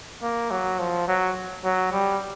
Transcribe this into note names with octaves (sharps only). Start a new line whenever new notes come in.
A#3
F#3
F3
F#3
F#3
G3